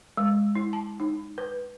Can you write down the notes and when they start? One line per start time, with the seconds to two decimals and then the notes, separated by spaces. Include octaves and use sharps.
0.17 G#3
0.55 E4
0.73 A5
1.00 D#4
1.38 B4